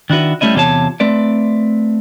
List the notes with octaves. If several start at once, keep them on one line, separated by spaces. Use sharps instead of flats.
D#3 D4 E4 F#4 B4
G3 A3 C#4 E4 D#5
E2 C3 F4 A4 C#5 A5
A3 C4 B4 D5